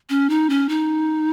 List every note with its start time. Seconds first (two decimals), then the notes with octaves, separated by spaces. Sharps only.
0.10 C#4
0.30 D#4
0.50 C#4
0.69 D#4